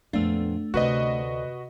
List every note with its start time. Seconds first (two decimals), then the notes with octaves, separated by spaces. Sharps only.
0.13 F2 A#2 A3 B3 D4 F5
0.74 D2 C3 F#4 B4 C5 D5 D#5